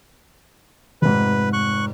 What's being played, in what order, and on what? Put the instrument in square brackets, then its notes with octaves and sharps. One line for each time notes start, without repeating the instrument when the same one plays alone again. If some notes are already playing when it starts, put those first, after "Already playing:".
[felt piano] F1 G#2 [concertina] B4
[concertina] C#6 F#6